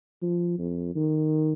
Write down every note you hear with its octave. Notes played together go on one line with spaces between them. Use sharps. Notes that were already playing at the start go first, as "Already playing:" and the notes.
F3
F2
D#3